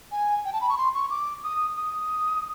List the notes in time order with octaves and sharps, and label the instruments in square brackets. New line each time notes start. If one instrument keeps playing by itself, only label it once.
[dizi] G#5
G5
A5
B5
C#6
C6
C#6
D6
D#6
D#6